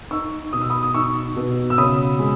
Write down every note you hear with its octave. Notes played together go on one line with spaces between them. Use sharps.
D#4 C#6 E6
B2 D#6
E6
B5 D#6
D#6
D#4 C#6 E6
B2
E6
C#3 B5 D#6
G#3